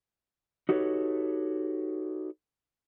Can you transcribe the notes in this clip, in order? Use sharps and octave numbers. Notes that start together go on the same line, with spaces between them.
D#4 F#4 G4 A4 B4 C#5